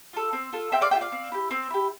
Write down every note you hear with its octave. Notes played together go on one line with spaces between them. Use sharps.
F4 A4
C4
F4 A4
C4 E5 G5
D5 F5
F4 A4 E5 G5
D5 F5
C4
E4 G4
C4
E4 G4